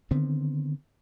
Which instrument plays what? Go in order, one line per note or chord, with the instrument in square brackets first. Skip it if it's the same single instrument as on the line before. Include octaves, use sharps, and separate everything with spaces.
[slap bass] D3 D#3 B3 C4